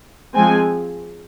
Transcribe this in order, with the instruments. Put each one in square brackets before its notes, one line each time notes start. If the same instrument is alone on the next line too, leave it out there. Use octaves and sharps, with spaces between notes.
[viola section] F3 G#3 C4 G#5